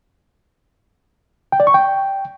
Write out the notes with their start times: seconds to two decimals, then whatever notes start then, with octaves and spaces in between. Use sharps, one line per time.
1.52 G5
1.60 D5
1.67 C#6
1.74 G5